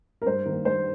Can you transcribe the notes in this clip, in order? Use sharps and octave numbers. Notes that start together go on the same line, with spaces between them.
A#4
G2 C5
D#3 A#3 A#4
G2 C5